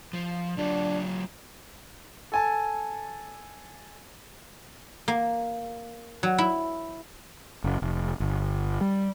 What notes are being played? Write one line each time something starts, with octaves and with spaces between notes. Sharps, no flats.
F3
F#3 D4 F4 G4
A4 G#5 A5
A#3
F#3
E4
F#1
F1
G1
G3